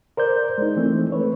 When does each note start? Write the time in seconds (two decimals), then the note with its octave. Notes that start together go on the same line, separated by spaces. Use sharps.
0.17 A#4 C5 D5 G6
0.58 G#3 D#4
0.77 E3 A3 C4
1.12 A3 B4 C#5